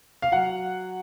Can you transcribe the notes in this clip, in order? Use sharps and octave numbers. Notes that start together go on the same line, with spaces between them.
F5
F#3 F#5